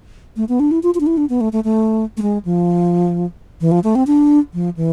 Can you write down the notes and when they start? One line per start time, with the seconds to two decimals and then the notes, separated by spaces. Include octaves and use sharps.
0.37 A3
0.49 B3
0.60 D4
0.71 E4
0.83 F4
0.95 F4
1.00 D4
1.07 E4
1.17 D4
1.29 B3
1.41 A3
1.53 A3
1.64 A3
2.17 A3
2.22 G#3
2.45 F3
3.61 E3
3.71 F3
3.84 A3
3.95 C4
4.07 D4
4.53 F3
4.77 E3